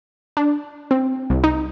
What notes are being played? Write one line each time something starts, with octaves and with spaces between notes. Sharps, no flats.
D4
C4
C2
D#4